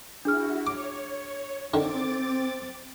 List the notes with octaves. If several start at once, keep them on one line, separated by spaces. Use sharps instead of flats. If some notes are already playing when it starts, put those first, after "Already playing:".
D4 E4 F#4 G#4 F6
C#5 D6
D3 D#3 C4 D6 A6